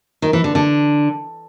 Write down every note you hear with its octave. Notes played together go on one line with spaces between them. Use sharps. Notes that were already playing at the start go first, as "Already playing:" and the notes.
D#3
E3
D3
D3